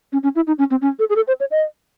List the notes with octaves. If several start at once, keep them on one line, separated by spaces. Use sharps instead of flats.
C#4
C#4
E4
D#4
C#4
C4
C#4
A4
G#4
A4
C5
C#5
D#5